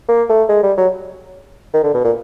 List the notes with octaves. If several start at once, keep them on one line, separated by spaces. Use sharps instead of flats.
A#3
A3
G#3
G3
F#3
D#3
D3
B2
A#2